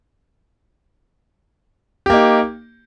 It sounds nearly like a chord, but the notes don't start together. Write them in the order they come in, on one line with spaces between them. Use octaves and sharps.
G4 A#3 D#4